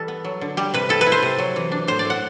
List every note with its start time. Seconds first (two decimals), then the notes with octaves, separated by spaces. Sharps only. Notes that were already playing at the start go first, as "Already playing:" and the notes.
Already playing: E3 G3 A4 B4
0.08 B3
0.25 F#3
0.41 D3
0.57 G3 G4
0.74 C3 B4
0.89 E4 A4
1.01 B4
1.06 E4
1.12 C5
1.23 C3
1.38 F#3
1.56 E3
1.72 D4
1.88 A2 C5
1.99 D5
2.05 A2 F#5